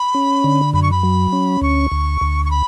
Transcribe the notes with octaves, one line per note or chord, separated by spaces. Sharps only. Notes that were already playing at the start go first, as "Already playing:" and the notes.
Already playing: B5
C#4
D3
F#2 B5
C#6
B5
F#3
C#4
D2 C#6
D2
D2
C#6
B5